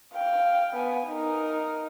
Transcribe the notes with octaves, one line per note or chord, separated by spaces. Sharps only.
F5 G5
B3 G#5
D#4 A#4